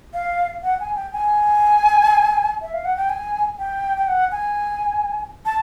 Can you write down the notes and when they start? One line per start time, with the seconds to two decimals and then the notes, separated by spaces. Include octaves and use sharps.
0.14 F5
0.63 F#5
0.80 G#5
0.96 G5
1.13 G#5
2.62 E5
2.74 F5
2.85 F#5
2.97 G5
3.10 G#5
3.59 G5
3.97 G5
4.08 F#5
4.32 G#5
5.46 A5